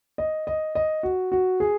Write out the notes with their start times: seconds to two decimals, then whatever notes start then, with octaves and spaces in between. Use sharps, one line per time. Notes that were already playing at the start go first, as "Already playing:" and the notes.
0.18 D#5
0.47 D#5
0.75 D#5
1.03 F#4
1.32 F#4
1.60 G#4